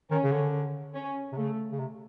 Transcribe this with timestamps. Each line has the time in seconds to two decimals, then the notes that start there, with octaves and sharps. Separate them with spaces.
0.10 D#3 C#4
0.24 C#3
0.32 D3
0.95 C#4
1.32 C3
1.37 C#3 A3
1.72 C#3
1.79 C3